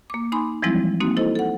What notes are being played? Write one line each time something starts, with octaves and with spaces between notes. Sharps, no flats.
A#3 D6
D#4 G#5 B5 C6 D6
E3 F3 G3 G#3 C4 E4
A#3 C4 D#4 F#4
E4 A4 C5 D#5
A4 F#5